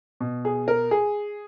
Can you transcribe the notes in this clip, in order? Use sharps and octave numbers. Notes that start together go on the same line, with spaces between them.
B2
G#4
A#4
G#4